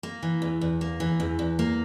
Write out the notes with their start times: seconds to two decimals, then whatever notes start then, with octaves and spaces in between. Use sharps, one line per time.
0.03 A#3
0.23 E3
0.42 E2
0.61 E2
0.81 A#3
1.00 E3
1.20 E2
1.39 E2
1.59 A#3